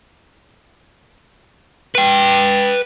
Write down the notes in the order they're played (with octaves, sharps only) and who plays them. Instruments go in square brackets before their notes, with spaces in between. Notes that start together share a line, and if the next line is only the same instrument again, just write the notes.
[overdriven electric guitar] B4 G5